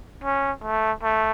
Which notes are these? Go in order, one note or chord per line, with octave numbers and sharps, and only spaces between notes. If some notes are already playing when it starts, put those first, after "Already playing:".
C#4
A3
A3